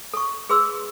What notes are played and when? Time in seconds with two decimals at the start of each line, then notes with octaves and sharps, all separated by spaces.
0.14 A4 C#6
0.50 G#4 B4 C6 E6